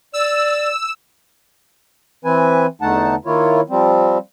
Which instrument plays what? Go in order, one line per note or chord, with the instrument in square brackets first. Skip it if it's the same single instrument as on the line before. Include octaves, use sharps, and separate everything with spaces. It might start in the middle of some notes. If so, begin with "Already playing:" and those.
[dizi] D5 [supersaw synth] E6
[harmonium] E3 C4 B4 G#5
E2 D3 A3 D#4 F#5 A5
D#3 A#3 E4 F4 C#5
F3 G3 C4